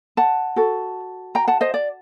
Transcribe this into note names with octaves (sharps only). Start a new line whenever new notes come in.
F#5 A5
F#4 A4
G5 A#5
F#5 A5
C5 D#5
D5